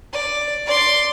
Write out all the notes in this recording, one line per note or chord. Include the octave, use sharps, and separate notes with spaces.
D5
D5 C6